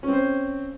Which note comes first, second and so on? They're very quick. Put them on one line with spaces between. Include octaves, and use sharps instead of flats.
C#4 C4 C5